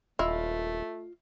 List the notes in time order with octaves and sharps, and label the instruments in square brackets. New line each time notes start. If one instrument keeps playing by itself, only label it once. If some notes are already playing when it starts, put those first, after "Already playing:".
[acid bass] D#1 [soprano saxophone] A3 [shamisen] E4 [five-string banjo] F4 D#5